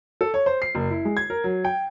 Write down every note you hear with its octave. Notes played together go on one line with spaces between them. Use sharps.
A4
C#5
C5
C7
F#1
E4
G#3
G#6
A#4
F#3
G5